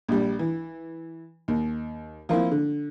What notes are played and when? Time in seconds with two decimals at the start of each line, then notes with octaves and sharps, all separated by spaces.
0.08 A#1 G3
0.39 E3
1.48 D#2
2.29 F3 A#3 C4 E4
2.51 D3